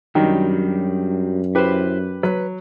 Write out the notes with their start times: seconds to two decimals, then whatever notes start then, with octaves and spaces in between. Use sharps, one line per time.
0.15 F#2 D#3 F#3 G3 D4 D#4
1.55 E4 G4 B4 C5
2.23 F#3 B4